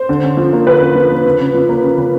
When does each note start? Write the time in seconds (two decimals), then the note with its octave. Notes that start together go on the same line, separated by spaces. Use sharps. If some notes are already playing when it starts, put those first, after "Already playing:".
Already playing: C5
0.09 D3
0.24 C#4
0.37 F3
0.53 A#3
0.67 D3 B4
0.81 C#4
0.95 F3
1.10 A#3
1.25 C#3
1.40 C#3
1.54 F3
1.69 A#3
1.84 C#3
1.98 C#3